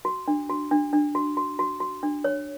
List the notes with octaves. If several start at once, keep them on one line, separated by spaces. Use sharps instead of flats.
F#4
D4
F#4
D4
D4
F#4
F#4
F#4
F#4
D4
C#5